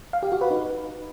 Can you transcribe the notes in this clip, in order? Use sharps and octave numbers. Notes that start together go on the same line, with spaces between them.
F5
G4
F#4
B4
D#4